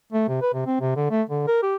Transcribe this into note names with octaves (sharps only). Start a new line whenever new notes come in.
A3
C3
B4
C3
C4
C3
D3
A3
D3
A#4
G4